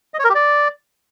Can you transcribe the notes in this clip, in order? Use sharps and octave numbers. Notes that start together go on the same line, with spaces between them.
D#5
C#5
A#4
G4
D5